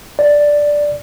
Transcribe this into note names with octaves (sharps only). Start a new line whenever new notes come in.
D5